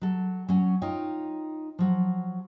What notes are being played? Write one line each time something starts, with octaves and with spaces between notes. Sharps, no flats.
F#3 A4
F#3 C#4
D#4 F4 C#5 G5
F3 F#3